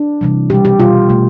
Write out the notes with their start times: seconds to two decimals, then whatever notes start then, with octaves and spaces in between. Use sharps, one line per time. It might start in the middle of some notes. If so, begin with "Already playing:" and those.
Already playing: D4
0.21 C3 E3 G3
0.50 B2 G3 G4
0.65 G4
0.80 B2 G3 F4
1.10 B2 A3